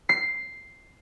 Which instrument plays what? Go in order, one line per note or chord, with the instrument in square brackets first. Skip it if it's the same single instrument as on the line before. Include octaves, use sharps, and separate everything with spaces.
[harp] C7